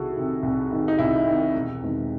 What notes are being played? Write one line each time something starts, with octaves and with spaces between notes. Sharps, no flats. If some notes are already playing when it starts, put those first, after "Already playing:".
Already playing: C2 C3 D#3 E4 F#4 G#4 A4
C3 D#3
C2
C3 D#3
D#4
C2 E4
C3 D#3
E1
E2 C3 D#3 G#3